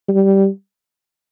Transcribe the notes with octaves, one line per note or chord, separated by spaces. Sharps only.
G3